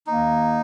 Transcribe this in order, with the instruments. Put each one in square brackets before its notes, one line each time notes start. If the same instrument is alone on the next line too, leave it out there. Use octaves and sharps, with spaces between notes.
[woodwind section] D#2 D#3 A#3 [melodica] D#4